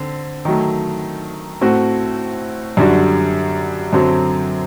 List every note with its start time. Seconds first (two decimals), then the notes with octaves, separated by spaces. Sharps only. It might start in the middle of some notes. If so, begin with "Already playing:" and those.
Already playing: D3 C4
0.45 D#3 F#3 A3
1.61 A2 A3 C4 F#4
2.77 F#2 D3 G3 D4 F#4
3.93 F#2 D3 F#3 C4